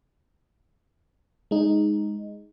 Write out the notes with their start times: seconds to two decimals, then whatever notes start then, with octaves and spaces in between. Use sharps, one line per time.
1.51 G#3 D#4